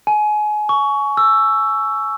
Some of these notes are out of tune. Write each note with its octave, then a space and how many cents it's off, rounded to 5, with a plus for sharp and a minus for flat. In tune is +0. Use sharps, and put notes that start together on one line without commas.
G#5 +25
C#6 +20
E6 +10